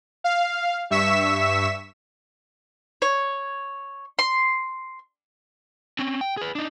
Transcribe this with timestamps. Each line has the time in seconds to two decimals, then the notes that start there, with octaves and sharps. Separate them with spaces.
0.24 F5
0.90 G2 E5 C#6 E6 B6 E7
3.02 C#5
4.19 C6
5.99 C4 C#4
6.21 G5
6.37 G#4 B4
6.55 D4 D#4